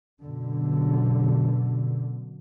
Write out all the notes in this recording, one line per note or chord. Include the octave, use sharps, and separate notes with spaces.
F#2 B2 D3